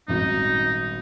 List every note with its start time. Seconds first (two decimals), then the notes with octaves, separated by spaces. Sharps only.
0.08 D#1 G#1 D#4 F#4